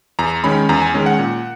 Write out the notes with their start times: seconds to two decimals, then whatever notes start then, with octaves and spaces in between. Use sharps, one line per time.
0.19 E2 A#5
0.44 D#3 G#3 C#4 B5
0.69 E2 A#5
0.82 G#5
0.94 D#3 G#3 C#4
1.06 F#5
1.19 A#2